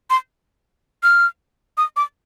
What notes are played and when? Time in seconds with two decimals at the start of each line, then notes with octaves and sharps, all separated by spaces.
0.10 C6
1.03 F6
1.78 D#6
1.96 D6